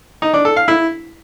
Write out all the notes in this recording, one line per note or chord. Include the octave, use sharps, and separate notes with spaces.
D#4
D4
A4
F5
E4